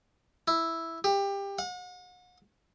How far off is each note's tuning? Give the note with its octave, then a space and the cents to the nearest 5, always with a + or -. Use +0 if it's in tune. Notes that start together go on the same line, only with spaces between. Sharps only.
E4 +0
G4 +20
F#5 -40